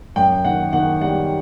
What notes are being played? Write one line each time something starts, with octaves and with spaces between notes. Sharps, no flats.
F#2 G5
D#3 F#5
D#3 F#5
G3 F#5